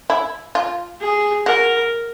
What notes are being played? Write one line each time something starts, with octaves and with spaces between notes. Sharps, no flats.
E4
F4
G#4
F#4 A#4